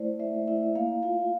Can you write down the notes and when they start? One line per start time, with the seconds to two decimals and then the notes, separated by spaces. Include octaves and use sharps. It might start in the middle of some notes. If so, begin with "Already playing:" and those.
Already playing: A3 E4 C5 D5
0.19 A3 E5
0.48 E4 E5
0.75 A#3 F5
1.03 F4 F5